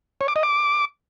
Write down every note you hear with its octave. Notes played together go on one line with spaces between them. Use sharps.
C#5
D6
D#5
D6